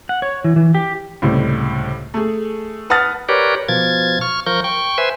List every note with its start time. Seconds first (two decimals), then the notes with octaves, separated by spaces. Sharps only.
0.09 F#5
0.22 C#5
0.44 E3
0.56 E3
0.75 G4
1.22 C#2 A2 C3 G3
2.14 A3 G#4
2.90 B4 F#5 A5 D#6 F6 A6
3.29 G4 A#4 B4 C#5 D5
3.68 B2 F3 G#6 A6
4.21 C#6 F6
4.46 F3 A#4 C#6 G6
4.64 G5 C#6
4.98 B4 C5 E5 G#5